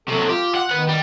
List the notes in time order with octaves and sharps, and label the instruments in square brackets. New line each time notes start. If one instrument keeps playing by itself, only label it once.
[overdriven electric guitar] C3 F#3 [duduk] A4
[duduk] F4 [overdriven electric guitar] G4
[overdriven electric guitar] F#5
[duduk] D#3 [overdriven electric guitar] B4 F#5
[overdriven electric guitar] G3